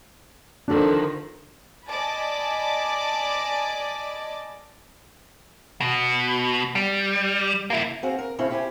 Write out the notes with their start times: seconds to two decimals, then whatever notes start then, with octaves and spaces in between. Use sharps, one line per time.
0.68 D3 D#3 F3 D4 A4
1.89 D5 D#5 G#5 A5 B5 D6
5.81 B2
6.75 G3
7.70 A#3 E4
8.03 C4 F#4 G#4 F5
8.18 A#4
8.38 C#3 C4 E4 C#5 F5
8.51 E4 G4 C5 G#5